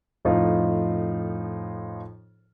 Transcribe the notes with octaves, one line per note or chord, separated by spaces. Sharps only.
F2 A2 F3 D#4 F4